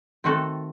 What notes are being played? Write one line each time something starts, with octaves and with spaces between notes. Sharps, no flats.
D#3 A3 C4 F#4 A4